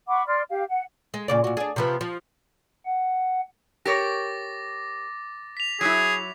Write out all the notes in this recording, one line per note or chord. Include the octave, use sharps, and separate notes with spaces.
F#5 B5 C#6 D6
D5 C6 F6
G4 F5
F#5
G#3
A#2 C#3 D5
A#2 F#4
D4 G#4
C3 F3 B3
F3
F#5
G4 A#4 C#5 D6 A6 A#6
B6 F7
F#3 E4 G#4